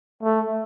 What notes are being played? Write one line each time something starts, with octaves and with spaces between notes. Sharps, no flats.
A3